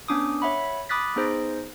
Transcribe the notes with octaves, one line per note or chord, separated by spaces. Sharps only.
B3 C#4 D4 D6 D#6
C#5 E5 F#5 B5
B5 D6 D#6 F#6 A6 B6
B3 D#4 G#4 C5 G6 A#6